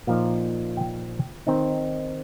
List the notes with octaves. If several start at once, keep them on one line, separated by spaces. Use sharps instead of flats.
A#2 F3 A#3 D#4 F5
G5
D#3 C4 D#4